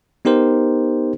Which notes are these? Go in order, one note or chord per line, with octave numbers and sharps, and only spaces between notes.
B3 D#4 G4 A#4 C5